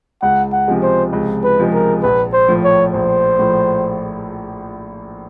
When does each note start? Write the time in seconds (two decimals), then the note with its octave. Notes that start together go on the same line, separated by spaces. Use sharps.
0.22 C#2 F#5
0.53 F#5
0.68 C3 F3 G#3
0.83 C5
1.13 C#2
1.44 B4
1.58 C3 F3 G#3
1.73 A#4
2.03 A#1 B4
2.33 C5
2.48 A2 F3
2.64 C#5
2.93 A#1 C5
3.39 A2 F3